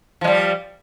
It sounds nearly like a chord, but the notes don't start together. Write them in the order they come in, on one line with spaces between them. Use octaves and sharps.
F3 G#3 G3